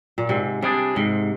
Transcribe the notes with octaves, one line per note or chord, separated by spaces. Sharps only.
A#2
G#2 C3
C3 G3 D4 G#4
G#2 C3